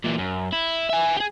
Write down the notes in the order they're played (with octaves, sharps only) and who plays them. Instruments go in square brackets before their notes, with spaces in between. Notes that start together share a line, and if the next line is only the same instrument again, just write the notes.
[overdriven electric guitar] A#2 E3
F#2
E4
E5 G#5
G4 G#4